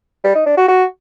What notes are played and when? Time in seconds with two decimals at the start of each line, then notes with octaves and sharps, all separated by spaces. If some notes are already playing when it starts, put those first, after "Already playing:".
0.24 G3
0.35 D#4
0.46 D4
0.57 F#4
0.68 F#4